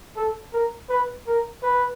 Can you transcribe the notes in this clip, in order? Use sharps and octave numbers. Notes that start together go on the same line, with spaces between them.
A4
A#4
B4
A#4
B4